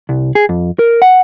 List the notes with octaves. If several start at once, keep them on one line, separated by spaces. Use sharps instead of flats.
C2
G#4
F2
A#4
F#5